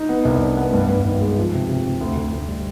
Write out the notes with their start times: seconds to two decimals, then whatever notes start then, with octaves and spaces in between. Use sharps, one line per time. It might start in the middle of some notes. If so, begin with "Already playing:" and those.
Already playing: D#4
0.09 B3
0.25 C2
0.42 D4
0.57 B3
0.73 G2
0.89 G2
1.04 G#1
1.21 G#3
1.37 F3
1.53 C3
1.69 C3
1.85 C3
2.01 D2
2.17 D2
2.32 D2
2.48 G3